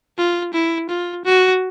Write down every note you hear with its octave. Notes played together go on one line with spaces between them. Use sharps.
F4
E4
F4
F#4